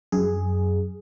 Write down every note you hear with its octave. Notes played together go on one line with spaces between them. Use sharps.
F#2 G#4